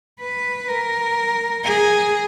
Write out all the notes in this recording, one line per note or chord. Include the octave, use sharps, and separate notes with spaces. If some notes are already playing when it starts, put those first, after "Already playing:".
B4
A#4
G#4